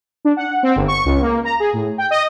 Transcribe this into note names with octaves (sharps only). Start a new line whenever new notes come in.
D4
F#5
C4
G1
C#6
C#2
A#3
A#5
G#4
A2
G5
D#5